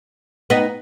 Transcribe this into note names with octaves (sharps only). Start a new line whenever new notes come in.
B3 D#4